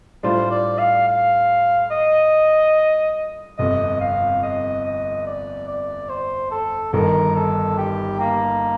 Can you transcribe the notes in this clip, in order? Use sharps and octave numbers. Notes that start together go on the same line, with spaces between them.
A2 G3 D4 F4 C5
D5
F5
F5
D#5
G1 F2 C3 D#5
F5
D#5
D#5
D5
D5
C5
A4
G1 G2 D#3 A#4
A4
G4
A#3